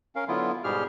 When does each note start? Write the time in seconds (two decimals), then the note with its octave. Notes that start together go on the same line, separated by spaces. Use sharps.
0.16 C#4 A#4 F5
0.28 D3 F#3 B3 E4 F4
0.64 G#2 B2 G3 G4 G#4 F6